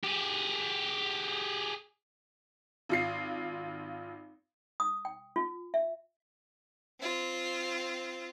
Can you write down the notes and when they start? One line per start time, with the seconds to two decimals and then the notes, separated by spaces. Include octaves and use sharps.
0.04 G4 G#4
2.89 G#1 F4 C7
4.80 D#6
5.05 G5
5.36 F4
5.74 E5
7.00 C4 F4